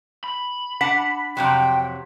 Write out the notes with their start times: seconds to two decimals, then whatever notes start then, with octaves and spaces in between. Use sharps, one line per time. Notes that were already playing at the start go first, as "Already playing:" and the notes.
0.24 B5
0.81 D4 F#5 A5 B6
1.37 F2 C3 F#3 G5